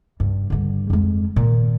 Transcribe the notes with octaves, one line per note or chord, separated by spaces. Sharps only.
G2
G2 D3
F2 G#3
A#2 D#3